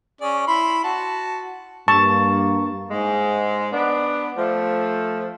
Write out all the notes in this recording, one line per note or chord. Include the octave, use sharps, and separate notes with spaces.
C#4 G#4 D5
E4 B5 C6
F#4 A5
G2 A#3 A5 C#6
G#2 G#3
B3 D4
F3 A3